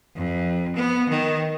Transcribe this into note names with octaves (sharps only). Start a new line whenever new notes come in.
F2
B3
D#3